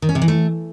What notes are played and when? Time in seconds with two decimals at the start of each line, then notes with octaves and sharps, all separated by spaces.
0.02 D#3
0.09 C#4
0.15 C3
0.22 E3
0.28 A3